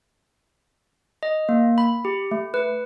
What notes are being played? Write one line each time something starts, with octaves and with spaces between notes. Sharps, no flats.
D#5
A#3
B5
G4
A3
B4